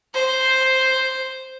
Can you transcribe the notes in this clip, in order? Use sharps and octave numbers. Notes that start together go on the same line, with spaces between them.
C5